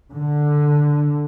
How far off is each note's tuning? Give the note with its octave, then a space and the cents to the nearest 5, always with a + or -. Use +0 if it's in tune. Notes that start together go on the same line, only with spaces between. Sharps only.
D3 +5